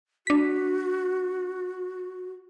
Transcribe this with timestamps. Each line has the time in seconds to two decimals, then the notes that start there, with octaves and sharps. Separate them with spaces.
0.27 D4 F#4 B6